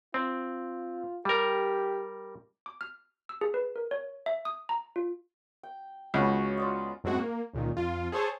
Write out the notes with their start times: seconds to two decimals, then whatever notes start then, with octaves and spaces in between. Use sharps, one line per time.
0.14 C4 F4
1.25 G3 G4 A#4
2.66 D6
2.81 F6
3.29 E6
3.41 G#4
3.54 B4
3.76 A#4
3.91 C#5
4.26 E5
4.45 D#6
4.69 A#5
4.96 F4
5.63 G5
6.14 C#2 B3 F#4 C#5
6.57 F4 D5 D#5
7.04 F#2 A2 G#3 C4 F#4
7.19 A#3
7.54 C#2 A#2 D#3
7.77 F2 F4
8.12 G#4 A4 C5 C#5 A5